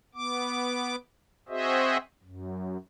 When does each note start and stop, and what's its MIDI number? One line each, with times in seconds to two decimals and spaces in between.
0.15 0.96 59
0.15 0.96 86
1.49 1.97 60
1.49 1.97 66
1.49 1.97 68
1.49 1.97 72
1.49 1.97 75
1.49 1.97 76
2.23 2.77 42